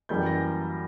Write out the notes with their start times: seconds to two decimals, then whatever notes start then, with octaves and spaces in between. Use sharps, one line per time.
0.09 F#2 E3 G3 A#3 G6
0.26 A#6